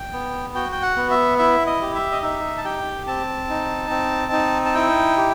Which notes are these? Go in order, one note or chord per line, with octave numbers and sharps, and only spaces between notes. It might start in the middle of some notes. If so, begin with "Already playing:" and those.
Already playing: G5
B3
F#4 G5
G5
F#5
B3
E5
E4 E5
D#5
G4
E5
D#5
D#4 E5
A5
G4 G5
C4 A5
D#4
C4
D#4
A5
E4 G5
G4